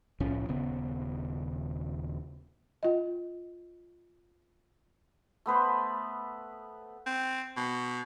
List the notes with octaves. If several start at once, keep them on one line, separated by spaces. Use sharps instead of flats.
C2 A2 F3 C#4
D#1 C#3 B3
F4 D#5
A3 B3 B4 C5
C4
B2